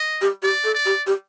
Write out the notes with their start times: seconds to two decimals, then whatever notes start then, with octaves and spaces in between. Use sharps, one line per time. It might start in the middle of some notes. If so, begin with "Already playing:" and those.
Already playing: D#5
0.21 G4
0.43 G4 D5
0.64 A4
0.74 D5
0.86 G4
1.07 G4